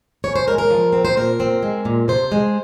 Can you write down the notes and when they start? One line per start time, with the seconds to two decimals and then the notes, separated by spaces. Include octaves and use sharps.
0.24 C#3 C#5
0.36 C5
0.47 G#3 A#4
0.58 A#4
0.71 F3
0.93 C4
1.05 C5
1.17 A#2 A#4
1.40 C4
1.63 G#3
1.85 A#2
2.08 C3 C5
2.32 G#3